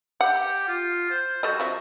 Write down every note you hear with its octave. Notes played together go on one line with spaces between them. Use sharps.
G4 F#5
F4
C5
G3 F#4 A4 D#5
F3 C4 E5